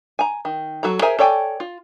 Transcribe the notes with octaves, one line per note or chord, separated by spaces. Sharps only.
G#5 A#5
D#3
F#3 F#4 A4 A#5
G#4 A#4 C5 E5 G#5
A4 C#5 D5 G5 G#5
F4